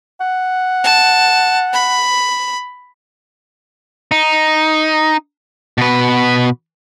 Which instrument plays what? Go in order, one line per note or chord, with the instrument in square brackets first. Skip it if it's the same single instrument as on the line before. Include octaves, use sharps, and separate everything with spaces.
[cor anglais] F#5
[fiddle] A5
B5
[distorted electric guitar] D#4
B2 B4